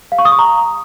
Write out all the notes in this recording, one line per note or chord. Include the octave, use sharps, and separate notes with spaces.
F5
C#6
D#6
C#6
A#5